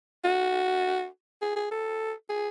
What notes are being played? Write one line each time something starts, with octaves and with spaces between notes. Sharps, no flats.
F#4
G#4
G#4
A4
G#4